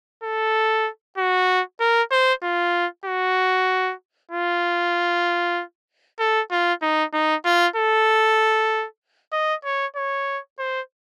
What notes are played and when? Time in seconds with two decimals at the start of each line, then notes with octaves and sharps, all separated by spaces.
0.24 A4
1.18 F#4
1.80 A#4
2.11 C5
2.43 F4
3.06 F#4
4.31 F4
6.20 A4
6.51 F4
6.82 D#4
7.14 D#4
7.45 F4
7.76 A4
9.33 D#5
9.65 C#5
9.96 C#5
10.59 C5